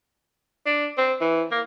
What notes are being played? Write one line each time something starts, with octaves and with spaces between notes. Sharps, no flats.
D4
C4
E3
A#3